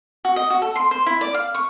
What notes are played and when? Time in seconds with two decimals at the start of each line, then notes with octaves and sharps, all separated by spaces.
0.25 F#4
0.36 D#5
0.50 F#4
0.62 A4
0.76 C6
0.91 C5
1.06 E4
1.21 D5
1.34 F5
1.55 C#6